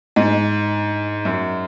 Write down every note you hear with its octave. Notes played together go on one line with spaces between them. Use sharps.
G#2
F#2